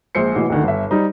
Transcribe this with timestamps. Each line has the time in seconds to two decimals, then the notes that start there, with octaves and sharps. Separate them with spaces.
0.15 A#1 G#3 C5 C7 C#7
0.35 A1 B2 E3
0.50 D2 D3 D#3
0.63 G1 E5
0.90 G3 D#4 C5